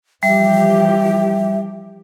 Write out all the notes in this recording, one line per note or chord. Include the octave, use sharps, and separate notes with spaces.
E3 F3 G3 G4 E5